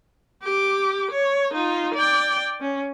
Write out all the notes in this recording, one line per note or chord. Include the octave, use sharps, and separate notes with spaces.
G4 D6
C#5
D#4 F4
D5 G5
C#4